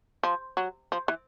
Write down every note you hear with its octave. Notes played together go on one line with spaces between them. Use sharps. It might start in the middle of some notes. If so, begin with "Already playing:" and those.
F3
F#3
F3
E3